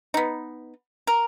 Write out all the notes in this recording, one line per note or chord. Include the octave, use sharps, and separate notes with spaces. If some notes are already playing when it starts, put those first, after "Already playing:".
B3 D#4
A#4